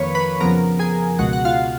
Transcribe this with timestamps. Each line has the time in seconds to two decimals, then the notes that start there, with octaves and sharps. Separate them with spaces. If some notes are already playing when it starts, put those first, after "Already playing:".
Already playing: F2 D#3 A#3 B4 C#5 B5 C#6
0.15 B4 B5
0.40 F2 C#3 F3 B3 A#4 A#5
0.79 G#4 G#5
1.19 C#2 B2 G#3 F#4 F#5
1.33 F#5
1.45 F4 F5